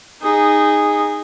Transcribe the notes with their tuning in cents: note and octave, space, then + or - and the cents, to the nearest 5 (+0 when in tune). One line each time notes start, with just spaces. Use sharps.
D#4 -5 G#4 -15